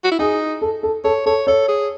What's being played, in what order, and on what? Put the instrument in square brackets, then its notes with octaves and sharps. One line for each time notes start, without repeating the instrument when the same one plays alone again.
[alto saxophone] F#4
E4
[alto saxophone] D#4 [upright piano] G#4
[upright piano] A4
A4
[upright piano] A4 [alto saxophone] C#5
[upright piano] A4 [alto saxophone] C#5
[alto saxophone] A4 [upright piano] C#5
[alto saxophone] G#4